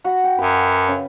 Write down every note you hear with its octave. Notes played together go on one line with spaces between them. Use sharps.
F#4 F#5 B5
G5
F#2 B4 F5
C#3